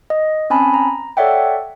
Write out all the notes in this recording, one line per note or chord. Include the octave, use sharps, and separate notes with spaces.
D#5
C4 C#4 G#5 A5 B5
A#5
A4 C#5 D5 E5 F#5 G5